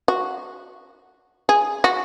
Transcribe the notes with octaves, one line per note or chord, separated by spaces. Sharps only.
F#4
G#4
F#4